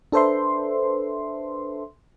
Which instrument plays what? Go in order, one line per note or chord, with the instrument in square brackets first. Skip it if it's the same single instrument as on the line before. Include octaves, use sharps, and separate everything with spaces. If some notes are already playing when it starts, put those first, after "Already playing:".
[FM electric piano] D4 A4 B4 C5 E5 C6